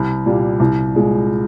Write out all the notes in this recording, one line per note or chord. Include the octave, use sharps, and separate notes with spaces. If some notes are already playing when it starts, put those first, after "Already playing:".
Already playing: C2
A#2 G3
C2
A#2 G#3